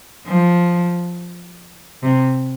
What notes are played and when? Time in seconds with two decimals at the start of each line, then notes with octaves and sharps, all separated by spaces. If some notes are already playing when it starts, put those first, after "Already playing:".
0.26 F3
2.03 C3